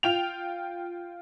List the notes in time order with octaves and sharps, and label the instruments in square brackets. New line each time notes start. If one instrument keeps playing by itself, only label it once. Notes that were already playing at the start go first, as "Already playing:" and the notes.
[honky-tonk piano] F4 G5 F7